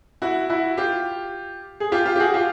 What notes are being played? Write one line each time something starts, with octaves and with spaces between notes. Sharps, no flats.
E4 F#4
E4 F#4
F4 G4
G#4
F4 G4
F4 G4
G4
F#4 G#4
F4 G4